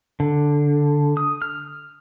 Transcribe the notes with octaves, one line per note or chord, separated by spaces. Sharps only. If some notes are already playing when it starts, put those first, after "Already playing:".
D3
D#6
F6